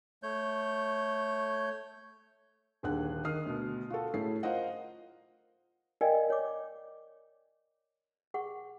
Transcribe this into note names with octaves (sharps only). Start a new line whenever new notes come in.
A3 C#5 G6
D#1 D#2 D3 G#4 F#5 F#6
D#3 D#6 F6 C7
D2 B2
F4 F#4 A4
A2 C#4 E4 G#4 A4 C7
F4 A#4 C5 D#5 F#5
A#4 D5 D#5 F5 G5 G#5
C#5 D6
G#4 F#5 C#6